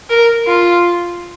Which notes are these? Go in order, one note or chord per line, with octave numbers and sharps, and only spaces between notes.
A#4
F4